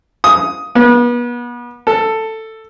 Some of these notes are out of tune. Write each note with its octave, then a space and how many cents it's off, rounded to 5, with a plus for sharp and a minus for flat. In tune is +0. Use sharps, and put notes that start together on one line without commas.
D#6 +10
B3 -35
A4 +10